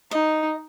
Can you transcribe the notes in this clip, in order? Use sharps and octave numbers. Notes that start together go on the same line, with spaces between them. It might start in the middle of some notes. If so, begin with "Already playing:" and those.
D#4 D#5